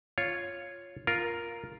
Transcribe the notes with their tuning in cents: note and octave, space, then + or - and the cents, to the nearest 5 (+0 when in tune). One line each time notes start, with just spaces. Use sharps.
F4 +0 C#5 +0
F4 +0 A#4 +0